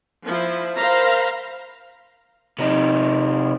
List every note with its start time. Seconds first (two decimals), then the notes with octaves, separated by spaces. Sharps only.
0.24 F3 E4
0.77 A#4 C5 F5 A#5 B5
2.59 C3 D#4